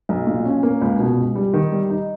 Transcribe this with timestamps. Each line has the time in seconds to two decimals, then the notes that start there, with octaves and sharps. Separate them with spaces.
0.09 B1
0.27 A#2
0.45 C#4
0.63 A#3
0.81 C#2
0.99 B2
1.18 C#2
1.35 G3
1.54 D#3
1.72 G3
1.90 D#4